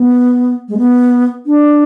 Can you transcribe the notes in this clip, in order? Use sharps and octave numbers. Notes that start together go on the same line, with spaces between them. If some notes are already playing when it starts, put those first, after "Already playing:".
Already playing: B3
G#3
B3
D4